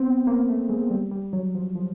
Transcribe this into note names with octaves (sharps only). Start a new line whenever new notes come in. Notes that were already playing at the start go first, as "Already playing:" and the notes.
Already playing: B3 C4
A#3
A3
G#3
G3
G3
F#3
F3
F3